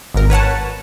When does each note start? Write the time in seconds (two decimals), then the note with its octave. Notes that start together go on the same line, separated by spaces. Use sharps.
0.14 G#1 A#4
0.30 B4 C#5 F#5 A5